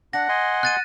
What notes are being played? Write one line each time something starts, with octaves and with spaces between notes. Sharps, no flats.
D4 F#5 A#6
D#5 G#5 C6
F#6 A6 D#7